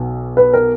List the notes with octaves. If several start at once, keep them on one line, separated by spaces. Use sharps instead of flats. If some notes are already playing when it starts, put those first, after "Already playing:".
Already playing: B1 B2
B4
A#4